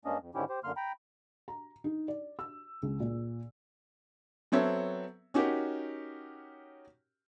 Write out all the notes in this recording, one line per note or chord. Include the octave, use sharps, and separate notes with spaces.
G2 G#3 A#3 C#4 D4 D#5
F2
G#2 D3 D#3 C#4 E4 G4
G4 C5
F#2 D3 A#3 C6 F6
G5 A#5 B5
A#5
D#4
D5
E6
C#2
A#2
F#3 B3 C4 A4 C#5 E5
C#4 D#4 F#4 G4 A#4